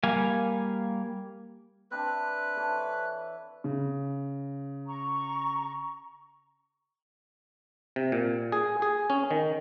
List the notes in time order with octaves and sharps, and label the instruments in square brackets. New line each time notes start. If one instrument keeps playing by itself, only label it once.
[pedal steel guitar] G3 A#3 F5 G#5
[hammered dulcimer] C4 D4 E5 [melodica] B4
[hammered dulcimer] E3 A4 C#5
[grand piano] C#3
[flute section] A#5 C#6
[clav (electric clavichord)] C3
A#2
G#4
G#4
C#4
D#3